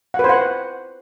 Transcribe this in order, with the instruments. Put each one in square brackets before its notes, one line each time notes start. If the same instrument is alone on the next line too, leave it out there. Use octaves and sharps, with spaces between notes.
[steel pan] F#5
B4
C5
F#5